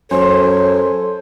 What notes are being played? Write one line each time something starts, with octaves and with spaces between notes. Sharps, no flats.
F#2 A4 C5 C#5 G#5